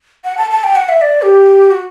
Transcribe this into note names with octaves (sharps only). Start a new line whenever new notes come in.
F#5
A5
A5
G5
F#5
E5
D5
G4
F#4